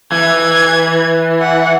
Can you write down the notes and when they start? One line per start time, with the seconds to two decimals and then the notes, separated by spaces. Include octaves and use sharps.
0.12 E3 G#6
1.42 F#5